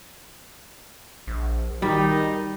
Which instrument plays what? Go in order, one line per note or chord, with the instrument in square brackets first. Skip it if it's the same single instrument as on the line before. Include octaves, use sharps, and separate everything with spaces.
[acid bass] A#1
[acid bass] D#3 [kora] G3 [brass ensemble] D#4